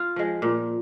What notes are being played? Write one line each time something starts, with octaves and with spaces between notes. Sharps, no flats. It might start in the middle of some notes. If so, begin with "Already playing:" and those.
Already playing: F4
F3 G#3
A#2